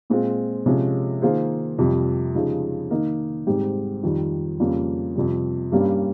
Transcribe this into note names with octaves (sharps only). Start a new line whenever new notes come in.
A#2 G#3 C4 F4
C3 F3 G#3 C#4 G#4
D#3 A#3 F4 G#4 C5
F2 C3 G3
C#3 F3 G#3 D#4 G4
D#3 A#3 D#4 A#4
G#2 G3 C4 G4
F2 D#3 G3
F2 C#3 G3 A#3 C#4
F2 C3 G3
G2 G3 A#3 C#4 G4